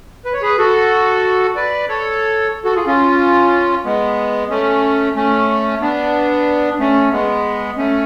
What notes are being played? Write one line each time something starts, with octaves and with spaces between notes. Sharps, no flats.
B4
C#5
G#4 B4
F#4 A4
B4 D5
A4 C#5
F#4 A4
F4 G#4
C#4 F4
G#3 B3
A3 C#4
A3 C#4
B3 D4
A3 C#4
G#3 B3
A3 C#4